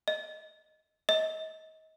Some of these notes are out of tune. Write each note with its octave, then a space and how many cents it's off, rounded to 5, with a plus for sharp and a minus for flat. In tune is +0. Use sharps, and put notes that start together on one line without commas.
D#5 +5
D#5 +30